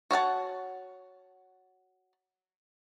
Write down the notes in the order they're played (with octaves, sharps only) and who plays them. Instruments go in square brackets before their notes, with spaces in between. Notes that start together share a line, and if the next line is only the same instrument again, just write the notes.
[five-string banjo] F#4 C#5 F#5 A5